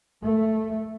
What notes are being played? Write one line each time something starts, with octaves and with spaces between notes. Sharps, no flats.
A3